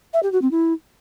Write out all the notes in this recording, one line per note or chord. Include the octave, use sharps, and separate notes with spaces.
E5
G4
F#4
C4
E4